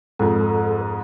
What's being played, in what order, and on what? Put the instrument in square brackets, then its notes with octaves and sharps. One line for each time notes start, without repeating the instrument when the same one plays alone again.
[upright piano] F2 G#2 [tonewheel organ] A4